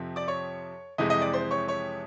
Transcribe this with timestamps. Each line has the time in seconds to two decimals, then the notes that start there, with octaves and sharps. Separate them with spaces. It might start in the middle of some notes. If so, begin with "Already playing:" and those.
Already playing: F2 C3 F3
0.16 D5 D6
0.28 C#5 C#6
0.98 F2 C3 E3 G#3 D#5 D#6
1.10 D#5 D#6
1.22 D5 D6
1.33 C5 C6
1.51 C#5 C#6
1.68 C#5 C#6